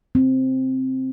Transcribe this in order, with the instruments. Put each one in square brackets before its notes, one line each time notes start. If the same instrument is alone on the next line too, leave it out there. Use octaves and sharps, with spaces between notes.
[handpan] C4